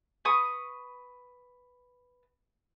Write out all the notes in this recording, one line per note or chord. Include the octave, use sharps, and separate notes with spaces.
B4 C#6 D#6